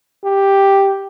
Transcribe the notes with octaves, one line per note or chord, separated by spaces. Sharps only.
G4